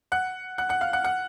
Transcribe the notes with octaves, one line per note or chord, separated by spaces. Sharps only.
F#5 F#6
F#5 F#6
F#5 F#6
F5 F6
F#5 F#6
F#5 F#6